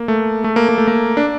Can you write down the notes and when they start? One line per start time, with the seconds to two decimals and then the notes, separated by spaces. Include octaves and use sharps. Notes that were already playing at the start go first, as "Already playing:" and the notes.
Already playing: A#3
0.08 A3
0.44 A3
0.56 A#3
0.69 A#3
0.78 A3
0.87 A#3
1.17 D4